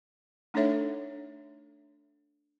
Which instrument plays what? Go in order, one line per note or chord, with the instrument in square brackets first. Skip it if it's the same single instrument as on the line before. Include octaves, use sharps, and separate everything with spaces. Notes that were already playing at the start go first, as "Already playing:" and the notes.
[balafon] A3 D4 D#4 A4 C#5 E5